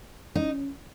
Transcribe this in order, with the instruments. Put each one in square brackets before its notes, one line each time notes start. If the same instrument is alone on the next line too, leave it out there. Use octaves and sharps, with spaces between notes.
[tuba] C#4 [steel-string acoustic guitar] D#4